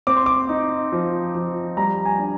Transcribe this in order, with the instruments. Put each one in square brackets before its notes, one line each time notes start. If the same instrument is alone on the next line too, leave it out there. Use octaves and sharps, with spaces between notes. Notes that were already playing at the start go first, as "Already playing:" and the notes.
[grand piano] C4 D6
C6
D6
D#4
F3
F3
G3 A#5
G#5
D4